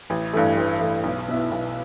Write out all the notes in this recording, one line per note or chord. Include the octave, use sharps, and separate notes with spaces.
A1
G2 E3 A3
A1
G2 E3 A3
B1
B2 B3 E4
B1